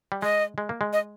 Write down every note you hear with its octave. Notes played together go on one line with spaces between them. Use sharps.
G3
G#3 D#5
G#3
A#3
G#3
D#5